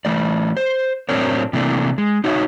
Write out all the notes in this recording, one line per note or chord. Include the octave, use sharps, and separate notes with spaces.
E3 A3 D5
C5
A2 F#3 C4 D4 A#4 C#5
C3 E3 A3 A#3 D4
G#3
D#4 F#4 C#5 D#5 E5